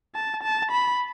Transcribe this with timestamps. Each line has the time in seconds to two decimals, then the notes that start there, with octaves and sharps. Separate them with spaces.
0.15 A5
0.43 A5
0.71 B5